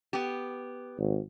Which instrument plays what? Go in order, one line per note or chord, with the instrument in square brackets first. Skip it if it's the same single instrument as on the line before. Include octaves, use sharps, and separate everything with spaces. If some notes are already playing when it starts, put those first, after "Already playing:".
[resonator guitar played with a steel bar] B3 G4
[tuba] G#1